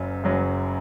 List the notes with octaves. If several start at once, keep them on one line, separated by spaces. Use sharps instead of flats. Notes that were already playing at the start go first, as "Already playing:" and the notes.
Already playing: F#1 F#2 F#3
F#1 F#2 F#3